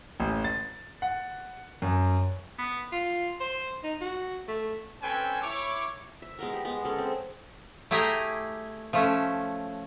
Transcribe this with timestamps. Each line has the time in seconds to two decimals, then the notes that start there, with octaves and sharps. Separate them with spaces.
0.20 A1
0.44 A6
1.02 F#5
1.82 F#2
2.58 B3
2.92 F4
3.40 C5
3.84 D#4
4.01 F#4
4.48 A3
5.02 C4 C#4 A4 B4 G5 G#5
5.42 E4 C#5 D6
6.22 E5
6.39 G#3 B3 A#4
6.53 G4
6.65 G#3 B3
6.84 G#3 C#4 A4
6.98 C4
7.91 A3 E4 G4 G#4 G5 A#5
8.93 F3 A3 C#4